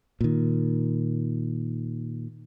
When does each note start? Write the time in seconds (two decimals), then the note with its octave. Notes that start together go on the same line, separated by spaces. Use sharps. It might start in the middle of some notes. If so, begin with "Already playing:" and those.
0.21 A#2 D#3